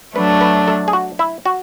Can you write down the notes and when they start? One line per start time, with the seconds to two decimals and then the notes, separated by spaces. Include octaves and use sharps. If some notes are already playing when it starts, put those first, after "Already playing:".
0.15 F#3 A3 D4 B4
0.41 B4
0.68 A4
0.88 G#4
0.93 F#4
1.19 E4
1.46 F#4